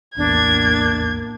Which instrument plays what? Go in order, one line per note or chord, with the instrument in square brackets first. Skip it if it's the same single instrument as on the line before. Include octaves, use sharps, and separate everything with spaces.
[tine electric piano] A#1 E2 [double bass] A2 A#3 [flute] D4 [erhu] G#6